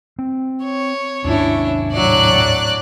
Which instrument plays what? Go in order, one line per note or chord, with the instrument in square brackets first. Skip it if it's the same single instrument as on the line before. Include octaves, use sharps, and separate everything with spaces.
[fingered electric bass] C4
[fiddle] C#5
[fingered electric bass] D#2 G#2 [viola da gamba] C#4 D4 E4
[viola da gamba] A2 F#3 [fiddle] D5 F#6